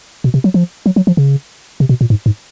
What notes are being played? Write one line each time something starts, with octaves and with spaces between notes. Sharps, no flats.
B2
C3
F#3
F3
F#3
F#3
F3
C#3
C3
B2
A#2
G#2
G#2